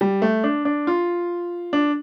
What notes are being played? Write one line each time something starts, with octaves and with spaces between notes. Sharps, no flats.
G3
A3
D4
D4
F4
D4